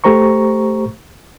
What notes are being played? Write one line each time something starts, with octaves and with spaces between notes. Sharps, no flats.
A3 G4 C5 A#5 C#6